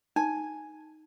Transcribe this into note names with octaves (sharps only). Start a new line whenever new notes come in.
D#4 G#5